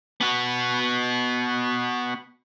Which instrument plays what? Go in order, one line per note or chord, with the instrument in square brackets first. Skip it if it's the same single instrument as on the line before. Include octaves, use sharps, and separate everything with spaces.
[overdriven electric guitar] B3 F#4